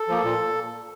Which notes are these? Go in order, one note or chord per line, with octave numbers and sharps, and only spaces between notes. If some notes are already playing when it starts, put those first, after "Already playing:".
Already playing: A4
F3 A#3
A#2